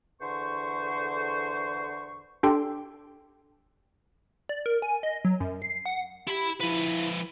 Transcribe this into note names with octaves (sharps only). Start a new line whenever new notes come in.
E2 D3 C5 C#6
D4 G4 A4 G5 C6
D5
A#4
G#5
D#5
F#3
F#2
C7
F#5
E4 G4 B5
F3 E4 B4